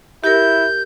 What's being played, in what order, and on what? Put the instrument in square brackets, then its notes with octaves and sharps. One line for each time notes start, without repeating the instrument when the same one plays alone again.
[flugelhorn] E4 [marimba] G4 A#4 [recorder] G6